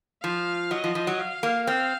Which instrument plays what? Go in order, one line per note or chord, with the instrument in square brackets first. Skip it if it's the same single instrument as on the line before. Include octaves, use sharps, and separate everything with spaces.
[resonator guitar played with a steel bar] F3 [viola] F5
[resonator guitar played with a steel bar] F#3 [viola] D#5
[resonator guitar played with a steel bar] F3
F3
F#3
[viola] F5
[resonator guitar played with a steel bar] A#3
[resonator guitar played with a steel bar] C4 [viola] F5